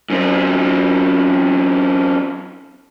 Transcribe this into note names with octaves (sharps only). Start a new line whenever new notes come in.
F#2 C4